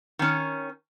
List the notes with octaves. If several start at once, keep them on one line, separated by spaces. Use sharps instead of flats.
D#3 C#4